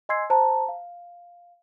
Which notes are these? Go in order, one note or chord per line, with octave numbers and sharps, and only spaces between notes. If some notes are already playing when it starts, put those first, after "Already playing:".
D#5 G#5 C6 E6 G#6 C7
C5 A5 A#5
F5